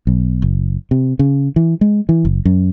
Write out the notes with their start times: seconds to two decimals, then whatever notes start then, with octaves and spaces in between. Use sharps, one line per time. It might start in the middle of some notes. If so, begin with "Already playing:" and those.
0.07 B1
0.42 F#1
0.91 C3
1.19 C#3
1.56 E3
1.81 G#3
2.09 E3
2.25 F#1
2.45 F#2